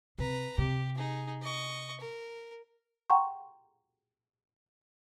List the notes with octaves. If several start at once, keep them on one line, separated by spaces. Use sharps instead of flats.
C3 B4 A#5
C3 G4
D#4 G#4
D#5 C#6
A#4
F#5 G5 A#5 C6 C#6